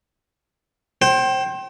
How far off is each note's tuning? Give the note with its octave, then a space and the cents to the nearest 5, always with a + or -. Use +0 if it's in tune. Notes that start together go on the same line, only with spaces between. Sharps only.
C5 +25 G5 -30